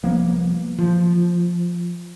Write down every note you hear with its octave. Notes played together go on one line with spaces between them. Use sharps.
C2 F3 A#3 B3
F3